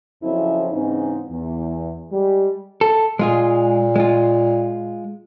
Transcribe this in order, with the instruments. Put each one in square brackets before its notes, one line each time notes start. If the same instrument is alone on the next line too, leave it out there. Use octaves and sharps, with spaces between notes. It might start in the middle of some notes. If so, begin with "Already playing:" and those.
[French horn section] F2 C#3 F3 F#3 C4 E4
G#2 C#3 E3 C4 D#4
E2
G3 G#3
[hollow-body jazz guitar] A4
[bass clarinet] A#2 [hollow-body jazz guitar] G#3 F4 G#4
[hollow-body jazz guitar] G#3 F4